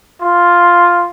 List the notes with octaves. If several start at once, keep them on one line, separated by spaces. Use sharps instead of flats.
F4